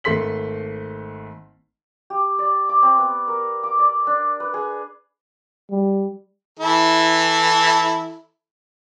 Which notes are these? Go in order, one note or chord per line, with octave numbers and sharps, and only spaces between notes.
G#1 A3 C6 B6 F#7
G4
D5
D6
C4
B3
A#4
D6
D5
D4
B4
G#4
G3
E3 E4 A4